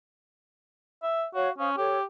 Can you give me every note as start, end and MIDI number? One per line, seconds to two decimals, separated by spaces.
1.02 1.25 76
1.34 1.50 66
1.34 1.50 73
1.34 1.50 77
1.58 1.77 61
1.58 1.70 72
1.58 1.70 77
1.58 1.70 87
1.77 2.04 67
1.77 1.98 69
1.77 1.98 73